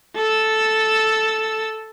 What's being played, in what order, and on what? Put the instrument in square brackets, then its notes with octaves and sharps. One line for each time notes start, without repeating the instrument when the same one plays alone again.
[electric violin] A4 E6